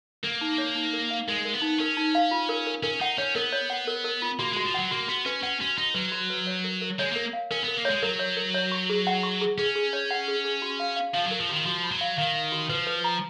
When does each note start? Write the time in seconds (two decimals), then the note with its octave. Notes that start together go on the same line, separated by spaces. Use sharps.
0.23 A#3 A#4
0.41 D#4
0.58 C#5
0.76 D#4
0.93 A#4
1.10 F5
1.28 G#3 A#4
1.45 A#4
1.54 B3
1.62 D#4
1.79 C#4 A#4
1.97 D#4
2.15 F5
2.31 F4
2.49 A#4
2.67 A#4
2.83 C#4 A#4
3.01 D#4 F#5
3.18 C#4 C#5
3.36 B3 A#4
3.52 C#5
3.70 F#5
3.87 A#4
4.04 A#4
4.22 F4
4.39 A#3 F#4
4.52 G#3 F#4
4.65 F3
4.74 F#3 F#5
4.91 A#3 F#4
5.08 B3 F#4
5.26 C#4 B4
5.43 C#4 F#5
5.61 C#4 F#4
5.77 D#4 F#4
5.94 F#3 B4
6.12 F#4
6.30 B4
6.47 C#5
6.64 A#4
6.82 A#4
6.99 G#3 C#5
7.12 A#3 A#4
7.33 F5
7.51 C#4 A#4
7.64 B3 A#4
7.77 A#3
7.85 C#5
7.90 G#3
8.02 F#3 A#4
8.19 C#5
8.37 A#4
8.54 C#5
8.72 C#6
8.89 G#4
9.07 F#5
9.23 C#6
9.41 G#4
9.58 C#4 G#4
9.76 G#4
9.93 C#5
10.11 F#5
10.28 G#4
10.45 G#4
10.62 F#4
10.80 F5
10.96 F5
11.14 F3 F5
11.27 F#3 A#4
11.40 F3
11.49 D#3 F#4
11.66 F3 F#4
11.84 B5
11.91 F#3
12.01 F5
12.18 D#3 F5
12.35 F5
12.52 F#4
12.69 F3 B4
12.87 B4
13.04 A#5